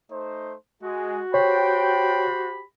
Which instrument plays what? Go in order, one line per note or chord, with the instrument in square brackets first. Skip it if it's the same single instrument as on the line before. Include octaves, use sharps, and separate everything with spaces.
[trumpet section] A3 D#4 C5
[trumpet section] G#3 [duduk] F#4
[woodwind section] G4 C5 B5 [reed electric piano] C#5 [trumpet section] G5